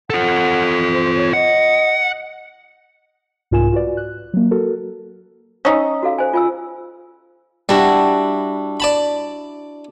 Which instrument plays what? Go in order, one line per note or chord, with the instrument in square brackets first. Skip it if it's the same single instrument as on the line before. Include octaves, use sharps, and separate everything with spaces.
[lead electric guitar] F4 A4 [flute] F#5
[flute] C5
C#5
[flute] D#5 [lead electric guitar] F#5
[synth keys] C2 G#2 F4 A#4 G#5 E7
F4 F#4 B4 D5
F#6
F#3 A#3
F#4 A4 A#4
[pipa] C#4 D#4 [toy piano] D#6 E6
[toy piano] F#4 A4 F5
C5 G#5
F4 G#5 E6
[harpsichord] G3 [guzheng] D4 E4 F#4
[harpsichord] D5 A5 B5